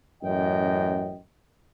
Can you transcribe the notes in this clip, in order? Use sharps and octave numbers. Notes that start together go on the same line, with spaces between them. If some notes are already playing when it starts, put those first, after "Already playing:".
A1 F#2 D#5 G5